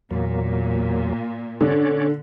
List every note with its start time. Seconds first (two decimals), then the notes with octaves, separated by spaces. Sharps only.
0.11 E2 A#2 F#3 A#3
1.61 D3 C#4 C#5 D5